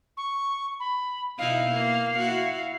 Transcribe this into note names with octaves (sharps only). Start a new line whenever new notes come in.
C#6
B5
B2 D#4 E4 F5
A#3
E4 F#4